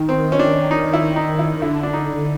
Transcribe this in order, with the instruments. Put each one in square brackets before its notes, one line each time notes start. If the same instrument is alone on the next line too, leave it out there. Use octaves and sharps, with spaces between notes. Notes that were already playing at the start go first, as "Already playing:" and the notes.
Already playing: [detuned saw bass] D#3
[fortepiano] C4
C#4
D4
D#4
E4
D#4
E4
[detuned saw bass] D3 [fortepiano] E4
[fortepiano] D4
D#4